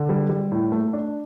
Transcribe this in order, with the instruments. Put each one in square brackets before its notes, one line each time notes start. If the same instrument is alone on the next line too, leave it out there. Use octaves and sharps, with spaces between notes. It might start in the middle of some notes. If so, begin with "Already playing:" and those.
Already playing: [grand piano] D3
G3
G3
A2
A3
D4